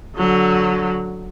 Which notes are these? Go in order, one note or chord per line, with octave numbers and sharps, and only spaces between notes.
D3 F#3